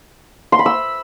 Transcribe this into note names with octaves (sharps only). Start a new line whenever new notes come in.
C6
B5
E6